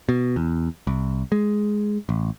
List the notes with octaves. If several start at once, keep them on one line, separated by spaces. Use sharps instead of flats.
B2
E2
C2
G#3
A1